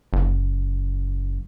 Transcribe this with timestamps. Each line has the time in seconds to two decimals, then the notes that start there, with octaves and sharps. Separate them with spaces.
0.13 F#1